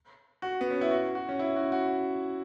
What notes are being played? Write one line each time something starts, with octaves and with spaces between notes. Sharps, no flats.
F#4
B3
C#4
E4
F#4
F#4
C#4
E4
F#4
F#4